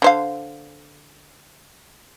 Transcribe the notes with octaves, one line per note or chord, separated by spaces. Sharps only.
D3 C5 F5